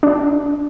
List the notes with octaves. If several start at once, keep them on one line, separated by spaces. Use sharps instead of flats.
D4